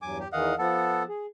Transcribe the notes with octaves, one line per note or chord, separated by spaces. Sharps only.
E2 G2 F#3 G#5 D6
G4
E2 D#3 E3 D#5 F5 F#5
F3 B3 A4 F#5 A5
G#4